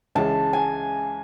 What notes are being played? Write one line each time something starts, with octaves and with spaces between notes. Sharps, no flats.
C#2 C#3 E3 G#3 C#4 A5
G#5